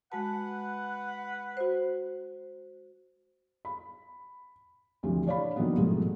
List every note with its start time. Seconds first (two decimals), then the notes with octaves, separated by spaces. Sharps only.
0.12 G#3 F#4 B4 F#5 A5
1.57 F#4 C5
3.65 B5
5.03 D2 C3 E3 F3
5.27 D4 C#5 D5 F5 B5
5.56 D3 D#3 F3 F#3 A#3 B3
5.77 C2 G#2 B2 F3 G#3 A3